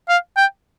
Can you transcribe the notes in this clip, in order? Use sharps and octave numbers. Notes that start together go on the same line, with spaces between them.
F5
G5